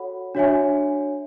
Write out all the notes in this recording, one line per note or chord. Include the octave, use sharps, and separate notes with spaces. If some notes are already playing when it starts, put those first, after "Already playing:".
Already playing: F#4 A4 C#5 F#5 B5
D4 F#4 C#5 E5 G#5